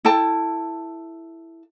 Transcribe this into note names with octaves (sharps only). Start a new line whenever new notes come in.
E4 A4 G5 A5